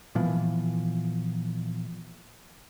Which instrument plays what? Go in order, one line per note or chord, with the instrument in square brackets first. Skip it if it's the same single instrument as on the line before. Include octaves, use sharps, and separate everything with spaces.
[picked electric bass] A#2 E3 F3 B3